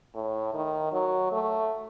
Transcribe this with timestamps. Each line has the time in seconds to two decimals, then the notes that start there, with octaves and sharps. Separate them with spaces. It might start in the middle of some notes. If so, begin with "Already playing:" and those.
0.15 A2
0.54 D#3
0.92 F#3
1.32 A3